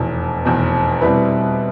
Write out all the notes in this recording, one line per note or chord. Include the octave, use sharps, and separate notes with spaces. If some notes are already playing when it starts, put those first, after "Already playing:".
Already playing: F1 E2 B2
F1 E2 B2
B2 G3 C4 E4 B4